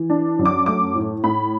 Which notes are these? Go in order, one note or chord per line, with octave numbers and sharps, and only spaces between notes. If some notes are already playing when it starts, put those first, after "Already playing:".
Already playing: E3
D4
F#2
D6
A3 D6
A2
A2 B5